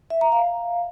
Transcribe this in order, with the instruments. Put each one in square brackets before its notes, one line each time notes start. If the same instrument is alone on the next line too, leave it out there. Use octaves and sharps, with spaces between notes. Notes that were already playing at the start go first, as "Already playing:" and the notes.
[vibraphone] E5
A#5
F5